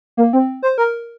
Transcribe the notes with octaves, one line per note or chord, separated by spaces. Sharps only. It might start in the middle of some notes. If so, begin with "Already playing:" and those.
A#3
C4
C5
A#4